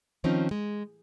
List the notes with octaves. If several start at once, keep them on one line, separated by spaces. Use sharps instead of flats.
D#3 F3 C4 C#4 D#4
G#3